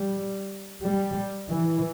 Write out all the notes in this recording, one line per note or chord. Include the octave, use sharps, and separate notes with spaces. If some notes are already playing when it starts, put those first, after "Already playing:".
Already playing: G3
G3
E3